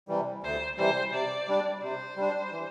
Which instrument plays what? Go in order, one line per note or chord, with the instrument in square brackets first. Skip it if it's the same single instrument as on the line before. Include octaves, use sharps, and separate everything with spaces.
[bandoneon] C3 E3 G3
[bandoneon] D2 [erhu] C5
[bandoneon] C3 E3 G3 [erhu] C5
[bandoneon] C3 [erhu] D5
[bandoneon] G3 D4
[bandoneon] C3 [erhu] C5
[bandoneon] G3 D4
E3